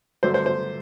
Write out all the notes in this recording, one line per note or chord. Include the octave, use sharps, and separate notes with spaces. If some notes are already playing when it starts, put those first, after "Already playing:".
G2 D3 F#3 A3 C5
C5
C5